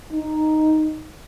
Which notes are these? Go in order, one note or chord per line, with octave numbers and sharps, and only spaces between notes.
D#4